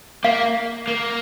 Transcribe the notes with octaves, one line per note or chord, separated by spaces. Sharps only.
A#3 F5
A#3